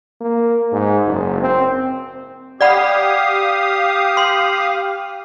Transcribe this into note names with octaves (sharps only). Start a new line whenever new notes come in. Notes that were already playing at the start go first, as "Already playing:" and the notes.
A#3
G#2
F#1
C4
G4 D5 F5 F#5 B5 D#6
C6